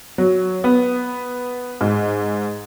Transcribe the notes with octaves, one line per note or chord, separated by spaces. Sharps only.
F#3
B3
G#2